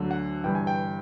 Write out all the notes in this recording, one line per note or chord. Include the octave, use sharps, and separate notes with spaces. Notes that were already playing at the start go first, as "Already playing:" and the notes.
Already playing: D2 D3 F#3
F#5
G1 G2 E3 G5
G#5
G5